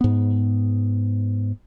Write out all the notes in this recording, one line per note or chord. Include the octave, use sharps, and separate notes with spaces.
G#2 B3